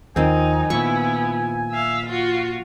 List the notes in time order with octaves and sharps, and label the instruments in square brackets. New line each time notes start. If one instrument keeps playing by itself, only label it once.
[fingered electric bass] D#2 F3 [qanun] D#3 C4 [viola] D#4 [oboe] G#5
[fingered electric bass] A#2 F3 [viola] B3 E4 [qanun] C#6
[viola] E5 F5
F4 F#4